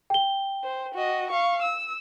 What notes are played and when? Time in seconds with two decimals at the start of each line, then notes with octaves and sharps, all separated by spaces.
0.10 G5 G7
0.64 C5
0.94 F#4 D#5
1.31 F5 C#6
1.62 E6